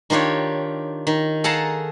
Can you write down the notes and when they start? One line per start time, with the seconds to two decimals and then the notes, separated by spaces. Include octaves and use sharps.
0.10 D#3 D4 F4 G4 C#5
1.07 D#3
1.44 G#4 A4 F5 F#5 A5 A#5